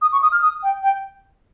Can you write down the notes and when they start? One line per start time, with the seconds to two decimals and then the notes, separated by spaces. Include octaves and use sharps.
0.02 D#6
0.12 C#6
0.22 D#6
0.32 F6
0.42 D#6
0.63 G5
0.83 G5